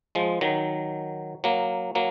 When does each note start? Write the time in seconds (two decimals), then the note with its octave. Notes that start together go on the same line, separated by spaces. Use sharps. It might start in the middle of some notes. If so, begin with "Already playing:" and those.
0.15 F3 G#3
0.41 D#3 F#3
1.44 F#3 A#3
1.95 F#3 A#3